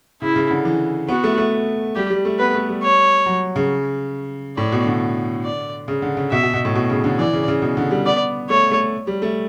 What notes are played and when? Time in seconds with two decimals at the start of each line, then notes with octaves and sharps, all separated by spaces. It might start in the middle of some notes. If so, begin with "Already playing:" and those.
0.22 C#3 E4
0.36 C#3
0.51 D3
0.65 E3
1.08 B3 F#4
1.24 A3
1.38 A3
1.95 G3 G4
2.10 G3
2.25 A3
2.39 B3 B4
2.55 A3
2.69 G3
2.83 C#5
3.26 F#3
3.56 C#3
4.57 A2 D5
4.72 B2
4.86 D3
5.45 D5
5.88 C#3
6.02 D3
6.17 C#3
6.31 B2 E5
6.43 B2
6.53 B2
6.65 A2
6.75 B2
6.90 C#3
7.04 D3
7.19 E3 D5
7.33 C#3
7.48 C#3
7.62 B2
7.77 D3
7.91 G3
8.06 B3 D5
8.50 A3 C#5
8.71 A3
9.07 G3
9.22 A3